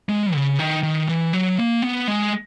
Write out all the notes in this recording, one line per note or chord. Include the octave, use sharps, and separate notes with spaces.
G#3
C#3
D#3
D#3
E3
F#3
A#3
B3
G#3